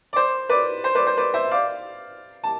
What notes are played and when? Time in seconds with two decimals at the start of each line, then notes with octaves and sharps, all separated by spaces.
0.13 D5
0.16 C5
0.49 B4 D5
0.84 C5
0.95 B4 D5
1.07 C5
1.17 B4 D5
1.34 C5 E5
1.51 D5 F5
2.44 A5